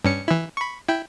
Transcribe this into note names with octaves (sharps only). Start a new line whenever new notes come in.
G2 C#4 C#7
E3 E4
B5 C#6
E4 G5